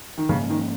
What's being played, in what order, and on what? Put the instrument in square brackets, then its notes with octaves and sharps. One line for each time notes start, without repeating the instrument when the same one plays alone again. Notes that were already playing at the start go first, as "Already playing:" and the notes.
[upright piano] D#3
[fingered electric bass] G#2 F3 A#3 C#4 [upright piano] C#3
[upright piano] D#3